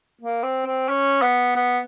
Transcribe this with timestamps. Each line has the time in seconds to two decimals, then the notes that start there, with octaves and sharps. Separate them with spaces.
0.22 A#3
0.43 C4
0.66 C4
0.89 C#4
1.22 B3
1.56 B3